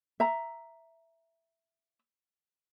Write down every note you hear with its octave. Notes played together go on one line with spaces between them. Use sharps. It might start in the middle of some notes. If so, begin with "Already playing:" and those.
E5 A#5